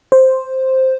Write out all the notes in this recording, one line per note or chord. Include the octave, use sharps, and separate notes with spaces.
C5